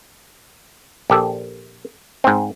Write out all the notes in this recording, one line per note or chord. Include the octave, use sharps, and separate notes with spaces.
A#1 G4 A4
G#2 C4